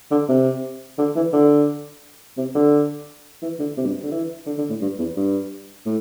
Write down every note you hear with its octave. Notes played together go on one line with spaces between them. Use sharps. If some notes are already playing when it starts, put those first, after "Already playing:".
D3
C3
D3
E3
D3
C3
D3
E3
D3
C3
G2
D3
E3
D3
D3
A2
G2
E2
G2
A2